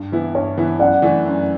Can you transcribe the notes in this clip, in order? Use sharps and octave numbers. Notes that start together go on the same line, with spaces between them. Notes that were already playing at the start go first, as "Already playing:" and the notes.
Already playing: G2
E3 B3 E4
G2 C#5
E3 B3 E4
F#2 D5 F#5
E3 A3 D4
F#2